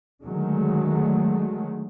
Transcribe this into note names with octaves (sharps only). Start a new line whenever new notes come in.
D3 D#3 F#3 G#3 A3